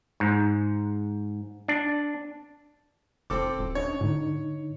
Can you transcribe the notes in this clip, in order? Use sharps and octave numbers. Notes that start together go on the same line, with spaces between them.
G#2
D4
F1 C4 A4 D6
D#1
C#4 D4 C#5 D#5
A2 D3 D#4